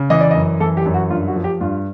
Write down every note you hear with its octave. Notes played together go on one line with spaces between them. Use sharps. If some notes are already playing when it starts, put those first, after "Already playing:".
Already playing: C#3
E3 D#5
D5
D#5
F#2
E3 A4
G4
F#2
F#4
G2 F4
F#4
F3
G4
G2 F4